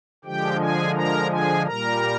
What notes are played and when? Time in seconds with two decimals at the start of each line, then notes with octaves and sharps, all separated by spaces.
0.24 D3 F3 G#3 G4 G5
0.60 G#4 G#5
0.95 A#4 A#5
1.30 G#4 G#5
1.66 A#2 G3 A#4 A#5